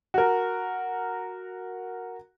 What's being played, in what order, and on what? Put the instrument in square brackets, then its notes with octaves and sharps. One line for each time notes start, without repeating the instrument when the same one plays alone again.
[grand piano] F#4 A#4